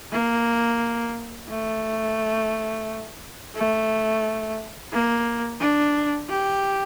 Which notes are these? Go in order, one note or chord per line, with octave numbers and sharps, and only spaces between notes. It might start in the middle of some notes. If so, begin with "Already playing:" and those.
A#3
A3
A3
A#3
D4
G4